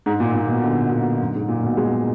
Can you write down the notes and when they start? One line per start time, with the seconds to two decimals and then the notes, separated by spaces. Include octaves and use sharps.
0.06 G#2
0.20 A#2
0.34 A#2
0.48 B2
0.63 D3
0.92 A#2
1.20 F#2
1.35 G#2
1.49 A#2
1.63 B2
1.77 G#3